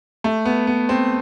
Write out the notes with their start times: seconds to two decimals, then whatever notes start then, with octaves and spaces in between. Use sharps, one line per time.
0.24 A3
0.45 B3
0.67 B3
0.89 C4